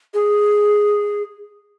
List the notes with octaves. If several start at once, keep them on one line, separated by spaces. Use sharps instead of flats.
G#4